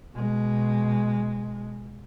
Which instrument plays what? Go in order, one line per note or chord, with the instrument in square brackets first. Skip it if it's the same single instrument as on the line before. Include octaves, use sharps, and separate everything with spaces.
[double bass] B2 G#3